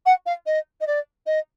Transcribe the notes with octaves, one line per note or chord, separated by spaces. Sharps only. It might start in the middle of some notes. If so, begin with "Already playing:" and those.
F#5
F5
D#5
D#5
D5
D#5